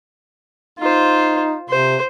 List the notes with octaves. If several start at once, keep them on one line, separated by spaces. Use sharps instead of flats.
D#4 F4 C5
C3 C5